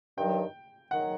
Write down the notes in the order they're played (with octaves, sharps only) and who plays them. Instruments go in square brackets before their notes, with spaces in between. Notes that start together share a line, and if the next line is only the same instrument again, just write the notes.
[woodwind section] G2 D#3 F#3 [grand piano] G5
[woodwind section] D#3 F#3 [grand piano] F#5